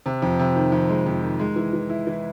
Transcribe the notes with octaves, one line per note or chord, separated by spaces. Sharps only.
C3
F2
C3
D#3
F2
G#3
F2
D#3
G#3
E3
E3
E4
E3